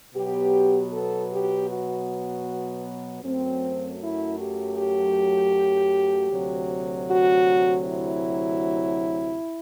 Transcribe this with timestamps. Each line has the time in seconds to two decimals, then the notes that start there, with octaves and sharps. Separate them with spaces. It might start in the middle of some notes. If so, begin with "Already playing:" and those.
0.14 B2 F#3 B3 G4
0.91 A4
1.30 G4
1.68 F#4
3.23 F#2 F#3 A3 C4
4.00 E4
4.38 G4
4.77 G4
6.31 D2 C3 F#3
7.09 F#4
7.85 E4